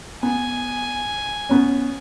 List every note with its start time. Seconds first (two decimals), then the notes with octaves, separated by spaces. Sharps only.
0.23 B3 G#5
1.49 B3 C#4